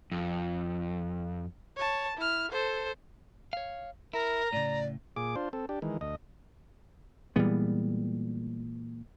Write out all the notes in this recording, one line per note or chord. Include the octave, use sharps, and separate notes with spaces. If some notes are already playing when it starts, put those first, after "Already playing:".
F2
C#5 A5
E4 F6
A4 C5
C#5 F5
E4 A#4 A#5
A2 C#3 D5
A#2 G#4 D6
D4 F4 C5
C4 A4
D4 G4
D#3 E3 G#3
D2 D#5
A#2 E3 G3 G#3 B3